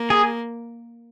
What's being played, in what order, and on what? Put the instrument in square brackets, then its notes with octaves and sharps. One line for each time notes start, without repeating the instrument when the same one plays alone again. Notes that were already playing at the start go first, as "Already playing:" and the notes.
Already playing: [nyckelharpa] A#3
[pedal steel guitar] G#4